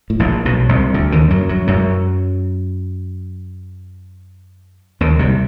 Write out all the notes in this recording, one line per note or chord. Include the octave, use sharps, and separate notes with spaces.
A2
A#1 A#2
B1 B2
C2 C3
D2 D3
D#2 D#3
F#2 F#3
F#2 F#3
F#2 F#3
D#2 D#3
C2 C3